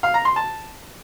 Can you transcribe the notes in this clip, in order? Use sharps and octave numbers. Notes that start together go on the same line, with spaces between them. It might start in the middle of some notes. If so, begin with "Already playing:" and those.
F5
A#5
C6
A5